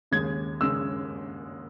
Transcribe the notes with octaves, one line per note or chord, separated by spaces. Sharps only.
D#2 C#3 G#3 G#6
C#3 G#3 E6